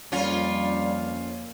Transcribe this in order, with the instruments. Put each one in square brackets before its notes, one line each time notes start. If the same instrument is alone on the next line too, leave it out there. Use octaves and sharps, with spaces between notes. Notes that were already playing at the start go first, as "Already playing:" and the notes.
[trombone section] F2 A#3 [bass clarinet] G3 [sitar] C#4 F4